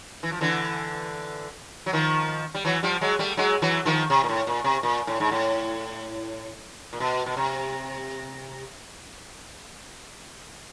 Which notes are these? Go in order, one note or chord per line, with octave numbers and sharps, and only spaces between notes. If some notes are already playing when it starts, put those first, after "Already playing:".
E3
F3
D3 E3
F#3
D#3 F3
G3
E3 F#3
F3 G3
F#3 G#3
G3 A3
F#3 G#3
E3 F#3
D#3 F3
C3
A#2
A2
A#2
C3
A#2
A2
G#2
A2
A#2
B2
B2
C3